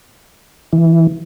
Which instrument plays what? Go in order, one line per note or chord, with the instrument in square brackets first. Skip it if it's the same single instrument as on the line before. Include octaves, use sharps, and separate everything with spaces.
[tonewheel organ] E3